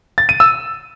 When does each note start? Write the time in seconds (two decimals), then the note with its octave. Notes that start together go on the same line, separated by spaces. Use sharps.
0.18 A6
0.29 D#7
0.40 E6